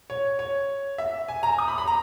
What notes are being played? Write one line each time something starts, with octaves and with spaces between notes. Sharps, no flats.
C#5
C#5
E5
G#5
A#5
D#6
B5
B5
A#5